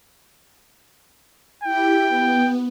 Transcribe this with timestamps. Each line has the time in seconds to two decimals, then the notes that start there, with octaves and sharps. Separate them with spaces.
1.64 E4 G4 G5
2.08 B3